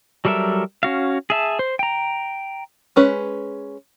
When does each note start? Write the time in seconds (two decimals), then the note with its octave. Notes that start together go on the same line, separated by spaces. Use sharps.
0.25 F#3 G3 A4 A#4 E5
0.83 C#4 F#4 F5
1.30 G#4 E5 A5
1.59 C5
1.79 G5 A#5
2.96 G#3 C#4 B4